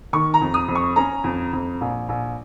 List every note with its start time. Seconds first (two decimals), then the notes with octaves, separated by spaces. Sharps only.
0.13 D#3 C#6
0.34 A#5
0.41 F2
0.54 D#6
0.68 F2
0.75 C#6
0.96 C#4 A#5
1.24 F2
1.53 F2
1.81 A#1
2.09 A#1